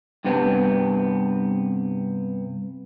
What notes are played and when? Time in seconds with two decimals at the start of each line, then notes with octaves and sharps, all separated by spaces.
0.24 G2 C3 B3 C4